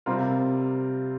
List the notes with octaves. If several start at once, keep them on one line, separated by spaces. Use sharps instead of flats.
C3 G3 C4 F4 A#4